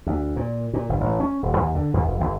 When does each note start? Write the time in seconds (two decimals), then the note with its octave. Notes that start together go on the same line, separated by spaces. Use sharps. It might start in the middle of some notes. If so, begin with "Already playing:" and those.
0.07 D2
0.36 A#2
0.73 A#2
0.89 G1
1.01 A1
1.20 C#4
1.43 D#1
1.57 D#2
1.75 D3
1.94 D#2
2.08 F1
2.20 G1